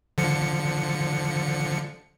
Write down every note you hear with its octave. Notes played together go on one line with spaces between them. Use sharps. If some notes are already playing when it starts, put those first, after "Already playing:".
D3 F3 C#7